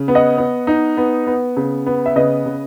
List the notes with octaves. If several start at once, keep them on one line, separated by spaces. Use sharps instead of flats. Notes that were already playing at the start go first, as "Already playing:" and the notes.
Already playing: C#3
B3
D#5 F#5
B3
D#4
B3
B3
C#3
B3
E5
C#3 B4 D#5
C#3